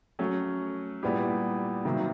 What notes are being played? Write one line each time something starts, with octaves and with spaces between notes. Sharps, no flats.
F#3 A3 C#4
A#2 G3 B3 E4 G4
C3 D#3 F#3 A#3